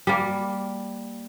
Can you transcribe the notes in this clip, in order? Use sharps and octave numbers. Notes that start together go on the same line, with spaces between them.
G3 A#3